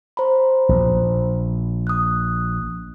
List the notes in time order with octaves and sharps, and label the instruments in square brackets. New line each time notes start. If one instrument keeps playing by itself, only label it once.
[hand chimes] C5 A#5 B5
[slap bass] A#1
[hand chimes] D#6 F#6